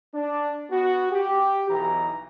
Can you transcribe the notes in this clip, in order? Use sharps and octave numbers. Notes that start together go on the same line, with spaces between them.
D4
B3 F#4
G4
B1 E3 A#5